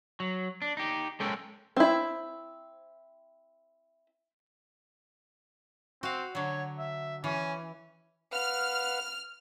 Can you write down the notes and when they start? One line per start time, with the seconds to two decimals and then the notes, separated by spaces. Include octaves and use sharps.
0.20 F#3
0.62 D4
0.77 D#4 G4
1.20 G#3 C#4 A4 A#4 G5
1.76 C4 E4
6.03 C4 F#4 F5
6.35 D3 F#3 C#5
6.79 E5
7.24 E3 C#4
8.33 B4 F5 F#5 F6